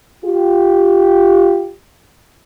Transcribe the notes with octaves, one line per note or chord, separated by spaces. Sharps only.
F4 G4